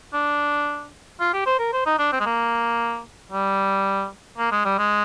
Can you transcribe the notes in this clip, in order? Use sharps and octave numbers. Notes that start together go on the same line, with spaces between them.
D4
F4
G4
C5
A#4
C5
D#4
D4
C4
G#3
A#3
G3
A#3
G#3
G3
G#3